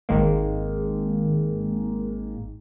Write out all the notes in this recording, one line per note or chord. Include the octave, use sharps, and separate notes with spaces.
G#1 D#3 G#3 A#3